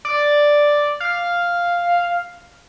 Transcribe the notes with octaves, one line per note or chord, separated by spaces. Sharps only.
D5
F5